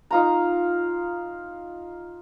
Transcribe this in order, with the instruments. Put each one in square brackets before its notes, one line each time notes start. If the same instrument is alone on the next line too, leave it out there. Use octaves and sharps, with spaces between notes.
[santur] D#4 F4 A#5